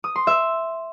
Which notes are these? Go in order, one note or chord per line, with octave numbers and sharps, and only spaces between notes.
D#6
C6
E5